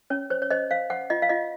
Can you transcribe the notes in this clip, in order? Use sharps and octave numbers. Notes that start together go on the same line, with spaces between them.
C#4 C#5
C5 C#5
C#5
C5 D#5
C5 F5
C5 F#5
F4 D#5
F5
F4 D#5